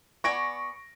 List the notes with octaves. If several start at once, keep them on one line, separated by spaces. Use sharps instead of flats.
B3 D5 G#5 C#6 A#6 D7